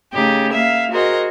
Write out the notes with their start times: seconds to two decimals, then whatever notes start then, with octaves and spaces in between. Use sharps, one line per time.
0.14 C#3 A3 D#4 G4
0.52 A#3 E5 F5
0.91 F#4 G#4 A#4 C5 D#5